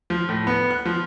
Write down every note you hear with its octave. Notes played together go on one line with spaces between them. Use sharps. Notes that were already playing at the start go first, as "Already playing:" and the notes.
F3
A2
B3
F#6
F3